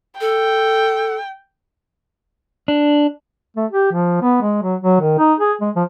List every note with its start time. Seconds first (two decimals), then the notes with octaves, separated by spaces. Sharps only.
0.21 A4 G5
2.68 D4
3.57 A3
3.72 G4
3.92 F3
4.22 B3
4.42 G#3
4.63 F#3
4.81 F#3
5.01 D#3
5.19 D#4
5.40 G#4
5.61 G#3
5.76 F3